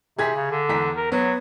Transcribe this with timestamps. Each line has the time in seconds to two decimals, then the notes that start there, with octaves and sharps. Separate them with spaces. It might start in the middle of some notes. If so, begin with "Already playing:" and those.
0.19 C3 G#4 G#6 B6
0.36 C#3
0.51 D3
0.69 E2 A#5 B6
0.97 A#4
1.12 F#3 B3